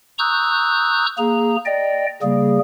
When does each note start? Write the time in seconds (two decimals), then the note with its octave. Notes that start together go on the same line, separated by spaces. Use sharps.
0.19 A#5 C#6 D#6 E6 F#6 G6
1.18 A#3 G#4 A#5
1.65 D5 D#5 G5
2.22 C#3 G3 A#3 G#4